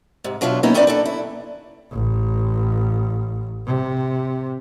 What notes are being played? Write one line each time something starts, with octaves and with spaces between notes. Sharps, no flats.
G#2 C3
B2 F#3 D4 F4 E5
F#3 A#3 B3 C#4 D#4 E4
C4 C#4 D#4 E4 D5
D4 E4 A4
E4
A1
C3